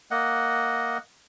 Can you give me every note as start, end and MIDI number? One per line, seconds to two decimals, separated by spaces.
0.11 0.98 58
0.11 0.98 75
0.11 0.98 78